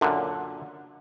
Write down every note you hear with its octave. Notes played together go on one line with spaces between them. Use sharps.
F#2 A#2 D3